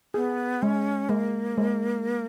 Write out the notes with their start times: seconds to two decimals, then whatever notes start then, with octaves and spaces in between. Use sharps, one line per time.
0.14 B3 G#4
0.62 G#3 C#4
1.09 G#3 A#3
1.57 G#3